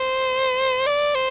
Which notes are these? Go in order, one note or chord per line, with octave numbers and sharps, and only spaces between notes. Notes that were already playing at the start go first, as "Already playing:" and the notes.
Already playing: C5
D5
C5